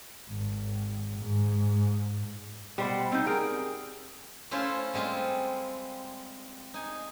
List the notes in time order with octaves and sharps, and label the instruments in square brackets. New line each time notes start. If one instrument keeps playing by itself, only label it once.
[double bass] G#1
G#2
[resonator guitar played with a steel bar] B2 [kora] G3 C5 F#5
[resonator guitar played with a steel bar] C4 D#4
[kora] G#4 A#4 [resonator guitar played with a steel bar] G5
[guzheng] A3 C#4 E4 F4 C5
G3 G#3 C4 F4
D#4 G#5